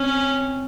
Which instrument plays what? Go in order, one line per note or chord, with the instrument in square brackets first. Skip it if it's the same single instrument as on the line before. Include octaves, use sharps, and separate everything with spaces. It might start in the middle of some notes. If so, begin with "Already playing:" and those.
Already playing: [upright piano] C4 [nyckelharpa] C#4